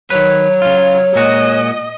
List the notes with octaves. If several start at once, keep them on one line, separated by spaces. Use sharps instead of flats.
D#3 F#3 B4 C#5
C#3 F4
A#2 G#3 F#4 D#5